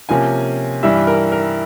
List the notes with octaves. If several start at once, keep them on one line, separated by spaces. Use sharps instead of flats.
C3 F3 A#3 C#4 G#5
G2 E3 G3 E5
A#4
A#4